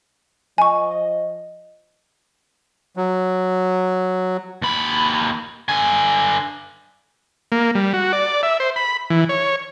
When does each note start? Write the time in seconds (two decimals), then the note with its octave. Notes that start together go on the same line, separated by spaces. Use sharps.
0.58 F3 D#5 G#5 C#6
2.97 F#3
4.62 D#2 B5
5.69 D3 G#5
7.52 A#3
7.75 G3
7.94 F#4
8.13 D5
8.43 E5
8.60 C5
8.76 B5
9.10 E3
9.29 C#5